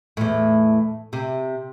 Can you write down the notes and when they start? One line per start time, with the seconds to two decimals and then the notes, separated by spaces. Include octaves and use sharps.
0.17 E2 A2
1.13 C3